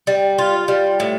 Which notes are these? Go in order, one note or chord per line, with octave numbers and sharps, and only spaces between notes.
G3
F4
G3
A2